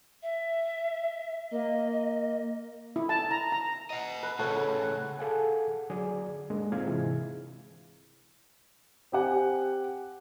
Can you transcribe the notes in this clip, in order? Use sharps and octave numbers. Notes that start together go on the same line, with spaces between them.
E5
A#3 D#5
E4
A5
A#5
A#5
D#5 F#5
B4
A2 C#3 A4 C#5 F#5
B4
G#4 A4 F5 F#5 G#5
D3 F#3 G#4 D5
G#2 G#3 A#3 D4
G#2 D3 C4 F4 F5 G#6
C3 E3 E4 G#4
C4 G4 F#5 G#5